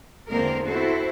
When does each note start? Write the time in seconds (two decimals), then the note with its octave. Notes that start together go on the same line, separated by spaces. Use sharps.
0.30 E2 D3 G#3 A#3 C4 A#4
0.67 C4 E4 F#4 A4 C5